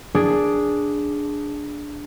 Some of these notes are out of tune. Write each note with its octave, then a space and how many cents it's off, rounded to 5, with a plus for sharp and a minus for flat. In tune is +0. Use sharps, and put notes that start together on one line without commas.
D4 -5 G#4 +0